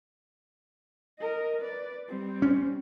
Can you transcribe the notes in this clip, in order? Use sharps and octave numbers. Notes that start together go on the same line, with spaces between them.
A#4 D#5
B4 D5
G3 C4
C#4